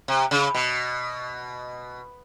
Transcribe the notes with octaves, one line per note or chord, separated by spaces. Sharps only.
C3
C#3
B2